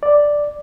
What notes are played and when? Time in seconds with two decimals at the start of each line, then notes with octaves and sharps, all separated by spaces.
0.03 D5